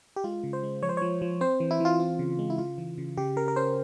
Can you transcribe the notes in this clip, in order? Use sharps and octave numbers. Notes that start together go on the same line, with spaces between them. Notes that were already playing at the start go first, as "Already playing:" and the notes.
G4
G#3 F4
C#3
C5
G#3
F3 C#5
C5
F3 C#5
F3
C4 C5
E3
E4
E3 F4
C4
C#3
G#3
E4
C#3 F4
E3
C#3
C#3 G4
C#3 A#4
A#4
C#4 C5